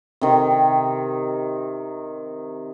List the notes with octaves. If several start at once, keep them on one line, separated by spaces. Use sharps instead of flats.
C3 D#3